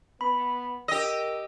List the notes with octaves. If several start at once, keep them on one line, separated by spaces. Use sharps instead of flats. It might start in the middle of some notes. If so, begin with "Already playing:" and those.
B3 B5
G4 A#4 D#5 E6